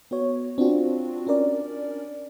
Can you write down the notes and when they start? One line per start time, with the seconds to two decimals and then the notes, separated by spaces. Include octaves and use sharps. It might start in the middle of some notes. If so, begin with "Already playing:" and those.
0.11 B3 F#4 C#5
0.58 C4 D4 F4 F#4
1.27 C#4 D4 A#4 D5